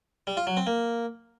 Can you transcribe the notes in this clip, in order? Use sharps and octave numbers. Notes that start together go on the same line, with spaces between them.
G3
F4
F#3
C4
A#3